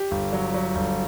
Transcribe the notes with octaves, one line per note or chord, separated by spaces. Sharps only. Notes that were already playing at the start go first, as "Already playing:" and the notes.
Already playing: G4
G1
F#3
F#3
G1